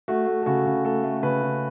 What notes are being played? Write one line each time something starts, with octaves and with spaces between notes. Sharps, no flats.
A3 F#4
A3
A4
C#3 F#4
C#3
A3 A4
A3
C#3 B4
C#3